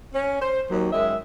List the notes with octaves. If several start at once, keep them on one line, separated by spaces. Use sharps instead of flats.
C#4
C5
D#2 D#3 F#3
F#2 D#3 G#3 E5